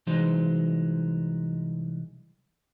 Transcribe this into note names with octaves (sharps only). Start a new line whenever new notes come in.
C2 E3 F#3 G#3 D#4 C5